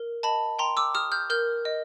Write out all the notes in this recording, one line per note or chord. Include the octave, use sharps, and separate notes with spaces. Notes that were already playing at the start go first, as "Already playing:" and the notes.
Already playing: A#4
D#5 A5 B5
G5 A#5 C6
D6 E6
G4 D#6 F6
F6 G6
A#4 F6 G6
D#5